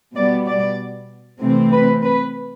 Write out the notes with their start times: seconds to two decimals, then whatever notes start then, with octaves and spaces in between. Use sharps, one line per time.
0.15 B2 G3 B3 D5
0.47 D5
1.41 C3 E3 A3 C4
1.72 B4
2.04 B4